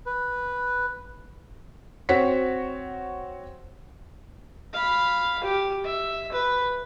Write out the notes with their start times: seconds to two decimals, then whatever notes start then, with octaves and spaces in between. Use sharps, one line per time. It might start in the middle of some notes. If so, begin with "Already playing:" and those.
0.06 B4
2.09 C4 F#4 C#5 B6
4.73 F5 B5
5.44 G4
5.85 E5
6.32 B4